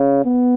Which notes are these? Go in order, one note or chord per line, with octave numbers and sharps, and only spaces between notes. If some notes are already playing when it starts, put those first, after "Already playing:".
Already playing: C#3
B3